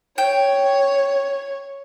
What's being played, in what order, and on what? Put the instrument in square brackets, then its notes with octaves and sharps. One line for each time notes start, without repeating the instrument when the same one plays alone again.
[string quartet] C#5 [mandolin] G5